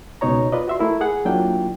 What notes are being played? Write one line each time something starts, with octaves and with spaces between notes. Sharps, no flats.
C#2 B2 D#4 C#5 A#5
F4 B4 D5 D#5
F#4 E5 C6
A3 E4 A#4
G#4 F#5
F#3 A#3 D4 E4 F4 G5